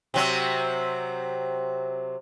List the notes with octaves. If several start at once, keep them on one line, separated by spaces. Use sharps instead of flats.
C3 F#3 C4